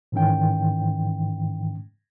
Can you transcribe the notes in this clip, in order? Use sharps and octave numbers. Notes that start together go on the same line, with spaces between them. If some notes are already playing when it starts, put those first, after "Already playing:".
G#2 D#3 E3 C#4 G5